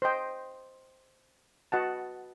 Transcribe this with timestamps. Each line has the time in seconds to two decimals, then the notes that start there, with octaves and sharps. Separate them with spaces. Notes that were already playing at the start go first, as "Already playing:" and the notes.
0.02 C5 D#5 G5 C6
1.72 F#4 B4 D#5 F#5 A5